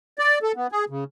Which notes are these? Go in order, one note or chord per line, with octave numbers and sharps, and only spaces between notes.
D5
A4
B3
G#4
C#3